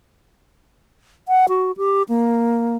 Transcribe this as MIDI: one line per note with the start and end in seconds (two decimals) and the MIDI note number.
1.28 1.46 78
1.49 1.72 66
1.77 2.03 67
2.09 2.77 58